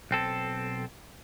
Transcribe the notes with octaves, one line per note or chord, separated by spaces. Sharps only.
B1 C4 A4